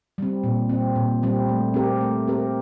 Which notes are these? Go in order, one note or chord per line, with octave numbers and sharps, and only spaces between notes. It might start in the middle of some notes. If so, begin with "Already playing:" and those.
G3 C4
A#2
G3 C4
A#2
G3 C4
A3
C4 G4 A#4
A3
C4 G4 A#4